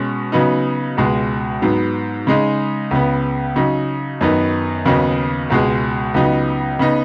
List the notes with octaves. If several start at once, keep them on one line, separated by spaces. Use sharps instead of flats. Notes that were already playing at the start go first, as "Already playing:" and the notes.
Already playing: B2 G#3 C#4
C#3 F#3 B3 D#4
C#2 B2 G#3
G#2 F#3 B3
C#3 G#3 D#4
C#2 C#3 B3
C#3 F#3 D#4
F#2 D#3 B3 D#4
D#2 C#3 F#3 B3 D#4
C#2 B2 G#3
C#2 C#3 F#3 B3 D#4
C#3 B3 D#4